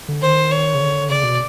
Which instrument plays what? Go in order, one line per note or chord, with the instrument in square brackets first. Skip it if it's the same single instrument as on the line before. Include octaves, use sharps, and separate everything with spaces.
[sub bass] D3
[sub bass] D#3 [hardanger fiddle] C5
[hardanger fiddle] C#5
[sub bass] C#3
D3
[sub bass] C#3 [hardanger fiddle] D5
[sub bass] B2